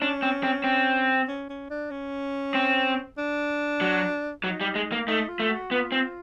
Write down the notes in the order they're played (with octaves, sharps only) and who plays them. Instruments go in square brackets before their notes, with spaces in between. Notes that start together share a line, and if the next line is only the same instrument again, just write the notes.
[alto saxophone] C#4 [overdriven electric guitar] D4
[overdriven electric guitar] C4
C4
C4
[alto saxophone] C#4
C#4
D4
C#4
[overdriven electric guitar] C4
[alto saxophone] D4
[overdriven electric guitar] F#3
[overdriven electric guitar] F#3 [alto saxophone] D#4
[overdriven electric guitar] G3
G#3
A#3
[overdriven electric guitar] A3 [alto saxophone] D#4
[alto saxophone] F4
[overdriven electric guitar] A3
[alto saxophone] F#4
[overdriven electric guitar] B3 [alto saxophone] F4
[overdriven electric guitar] C4